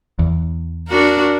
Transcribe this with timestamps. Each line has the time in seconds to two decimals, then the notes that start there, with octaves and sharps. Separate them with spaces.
0.19 E2
0.88 D4 F#4 A#4